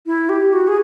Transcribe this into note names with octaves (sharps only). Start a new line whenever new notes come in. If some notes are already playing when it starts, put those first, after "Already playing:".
E4
G4
F#4
G#4